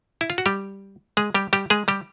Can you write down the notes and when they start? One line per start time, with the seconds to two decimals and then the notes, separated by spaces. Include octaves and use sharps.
0.21 E4
0.30 F4
0.38 F#4
0.46 G3 G4
1.17 G#3 G#4
1.34 G3 G4
1.53 G3 G4
1.70 G#3 G#4
1.88 G3 G4